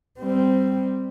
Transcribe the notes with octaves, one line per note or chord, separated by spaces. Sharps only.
G3 C4